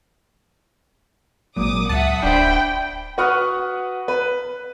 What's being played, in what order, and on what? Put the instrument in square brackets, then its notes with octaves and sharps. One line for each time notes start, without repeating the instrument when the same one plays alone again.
[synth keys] G#1 A#2 [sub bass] F#3 [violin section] D6 D#6
[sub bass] C#2 [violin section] E5 F#5 D#6 [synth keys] A5
[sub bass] D1 [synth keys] D4 C5 [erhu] G5 [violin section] B5
[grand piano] F#4 B4 F#5 C#6 D#6 F6
B4